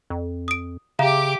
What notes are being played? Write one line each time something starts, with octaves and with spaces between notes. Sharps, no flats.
F2
D#6 D7
C#3 G4 E5 F5 A#5 D6